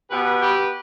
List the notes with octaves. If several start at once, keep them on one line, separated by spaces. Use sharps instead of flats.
B2 B3 G4 B4
G4 B4